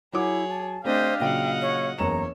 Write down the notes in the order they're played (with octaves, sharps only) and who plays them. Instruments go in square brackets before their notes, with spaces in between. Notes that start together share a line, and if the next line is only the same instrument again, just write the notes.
[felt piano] F#3 F#5 D6 [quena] E4 [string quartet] G#4 C#5
[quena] A5
[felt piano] A3 C4 [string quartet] D4 G4 D#5 [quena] C5 [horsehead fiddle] F5
[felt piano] A#2 C#3 F#3 [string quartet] D#5 F#5 [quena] G5
[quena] C#5
[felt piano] F#1 E2 E7 [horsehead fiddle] C#5 [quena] A#5